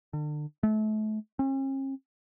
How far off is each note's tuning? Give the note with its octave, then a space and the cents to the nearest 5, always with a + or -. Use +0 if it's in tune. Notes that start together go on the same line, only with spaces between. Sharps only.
D3 +40
A3 -35
C#4 -45